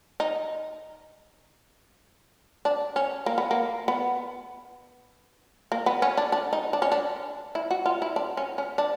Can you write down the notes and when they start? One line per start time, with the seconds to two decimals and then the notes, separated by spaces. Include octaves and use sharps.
0.20 D#4
2.65 D4
2.96 C#4
3.26 A#3
3.38 B3
3.51 A#3
3.88 B3
5.72 A#3
5.86 B3
6.02 C#4
6.17 D4
6.32 D4
6.53 D#4
6.73 D4
6.82 C#4
6.92 D4
7.55 E4
7.71 F#4
7.86 F4
8.02 E4
8.16 D4
8.37 C#4
8.58 C#4
8.78 D4